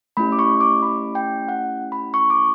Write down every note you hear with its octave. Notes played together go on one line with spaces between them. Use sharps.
A3 C#4 E4 G4 B5
D6
C#6
D6
B5
G5
F#5
B5
C#6
D6